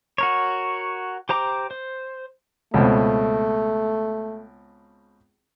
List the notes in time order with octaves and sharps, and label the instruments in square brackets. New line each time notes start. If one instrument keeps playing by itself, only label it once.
[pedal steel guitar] F#4 A#4 C#5
G4 C5 A#5 D6
C5
[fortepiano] C#2 B2 C4 [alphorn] A3